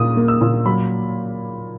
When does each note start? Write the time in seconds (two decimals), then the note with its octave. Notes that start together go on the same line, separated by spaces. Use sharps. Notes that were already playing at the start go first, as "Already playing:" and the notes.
Already playing: A#2 A#3 D#6
0.17 A#3
0.28 E6
0.41 A#2
0.66 F#3 B5